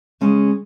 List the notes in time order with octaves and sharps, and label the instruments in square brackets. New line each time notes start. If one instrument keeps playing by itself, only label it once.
[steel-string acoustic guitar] C#3 G#3 C#4